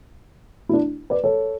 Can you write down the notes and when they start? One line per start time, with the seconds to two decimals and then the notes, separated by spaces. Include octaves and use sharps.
0.69 E4
0.73 D4
1.10 B4 D5
1.24 A4 C#5